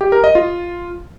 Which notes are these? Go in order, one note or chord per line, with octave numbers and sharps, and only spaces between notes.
G4
A#4
D#5
F4